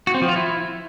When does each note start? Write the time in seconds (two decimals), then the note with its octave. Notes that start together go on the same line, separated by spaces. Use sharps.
0.07 F#4
0.14 C4
0.21 F3
0.29 F4
0.36 E4